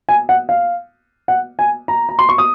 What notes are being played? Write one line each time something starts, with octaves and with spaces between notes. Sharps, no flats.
G#5
F#5
F5
F#5
G#5
A#5
A#5
C6
C#6
D#6